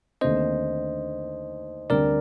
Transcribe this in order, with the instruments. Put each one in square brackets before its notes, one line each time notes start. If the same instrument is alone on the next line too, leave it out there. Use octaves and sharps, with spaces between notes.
[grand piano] D#2 D3 A3 C4 [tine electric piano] C5 D#5
[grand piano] D2 D3 G3 C4 G4 [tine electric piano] A#4 D5